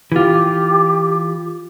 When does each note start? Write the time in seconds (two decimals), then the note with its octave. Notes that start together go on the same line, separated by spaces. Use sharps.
0.12 E3 F4 G4